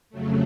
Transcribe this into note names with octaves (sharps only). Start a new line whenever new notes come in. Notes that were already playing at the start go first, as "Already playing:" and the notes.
F2 C#3 F#3 A3